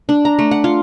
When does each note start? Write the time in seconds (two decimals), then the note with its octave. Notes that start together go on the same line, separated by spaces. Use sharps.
0.09 D4
0.25 A#5
0.39 A3
0.51 F#5
0.64 F4